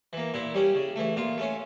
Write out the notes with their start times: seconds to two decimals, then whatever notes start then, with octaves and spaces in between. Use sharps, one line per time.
0.13 E3 A#3
0.34 A#2 E4
0.54 G3 C#4
0.75 C#3
0.96 E3 A3
1.16 A#2 F4
1.38 A3 C#4